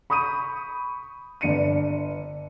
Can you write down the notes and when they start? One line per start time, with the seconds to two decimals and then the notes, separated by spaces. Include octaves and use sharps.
0.10 B5 C#6 D#6 G6 D#7
1.41 G1 D4 C#7 D#7